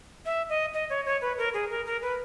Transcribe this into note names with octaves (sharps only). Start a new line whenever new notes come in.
E5
D#5
D#5
C#5
C#5
B4
A#4
G#4
A#4
A#4
B4